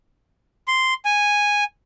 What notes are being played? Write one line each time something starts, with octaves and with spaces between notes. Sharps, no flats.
C6
G#5